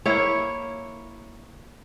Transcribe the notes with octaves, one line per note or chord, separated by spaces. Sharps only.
A#3 E4 C#5